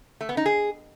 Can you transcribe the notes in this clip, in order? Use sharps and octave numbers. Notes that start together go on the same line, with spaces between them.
A3
B3
D#4
G#4